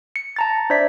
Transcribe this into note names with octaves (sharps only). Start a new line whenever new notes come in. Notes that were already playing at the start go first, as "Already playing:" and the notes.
C#7
A5 A#5 A6
D4 C5 D5 E5 G#6 B6